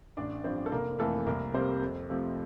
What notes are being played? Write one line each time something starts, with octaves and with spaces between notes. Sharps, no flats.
A1 D4 D5
G2 F3 C4 C5
A4
F1 A#3 A#4
F2 E3 A3 A#3 A4
C2 A#3 A#4
C3 G3 A#3 C4 C5
F2
C3 F3 A3 C4